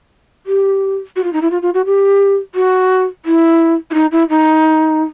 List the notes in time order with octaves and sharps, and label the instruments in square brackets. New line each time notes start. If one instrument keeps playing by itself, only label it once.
[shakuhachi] G4
F#4
F4
D#4
E4
F4
F4
F#4
G4
F#4
E4
E4
D#4
E4
D#4